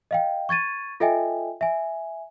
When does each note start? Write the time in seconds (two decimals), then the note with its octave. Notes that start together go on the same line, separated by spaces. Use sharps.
0.11 D#5 F5 G5
0.49 C#6 G#6 A6 D#7
1.00 F4 A4 D#5 E5 G5 G#5
1.61 E5 G#5